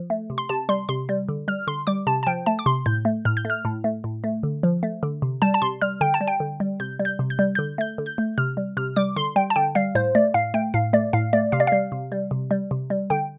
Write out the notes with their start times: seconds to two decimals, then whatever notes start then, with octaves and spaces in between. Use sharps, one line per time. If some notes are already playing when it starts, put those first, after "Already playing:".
Already playing: F3
0.10 A3
0.30 C3
0.38 C6
0.49 C3 A5
0.69 G3 C6
0.89 C3 C6
1.09 G3
1.29 D3
1.48 G3 F6
1.67 D3 C6
1.87 G3 D6
2.07 C3 A5
2.23 A5
2.27 F3 G5
2.46 A3 A5
2.59 D6
2.66 C3 C6
2.86 A2 G6
3.05 A3
3.25 A2 F6
3.37 G6
3.45 A3
3.50 F6
3.65 A2
3.84 A3
4.04 A2
4.24 A3
4.43 D3
4.63 F3
4.83 A3
5.03 D3
5.22 C3
5.42 G3 A5
5.54 A5
5.62 C3 C6
5.82 G3 F6
6.01 D3 G5
6.14 A5
6.21 G3
6.28 G5
6.40 D3
6.60 G3
6.80 C3 G6
6.99 G3
7.05 G6
7.19 C3
7.30 G6
7.39 G3
7.55 D3 G6
7.78 A3 G6
7.98 D3
8.06 G6
8.18 A3
8.38 C3 F6
8.57 G3
8.77 C3 F6
8.96 G3 D6
9.16 D3 C6
9.36 G3 G5
9.50 A5
9.56 D3 G5
9.75 G3 F5
9.95 A2 C5
10.15 A3 D5
10.34 A2 F5
10.54 A3 G5
10.74 A2 F5
10.93 A3 D5
11.13 A2 F5
11.33 A3 D5
11.52 C3 F5
11.60 D5
11.67 G3 F5
11.92 C3
12.12 G3
12.31 C3
12.51 G3
12.71 C3
12.90 G3
13.10 D3 G5